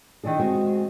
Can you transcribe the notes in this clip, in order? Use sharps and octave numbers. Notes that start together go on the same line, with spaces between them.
D#3 E3 D4 G#4
G#3 C4 F#4 G#4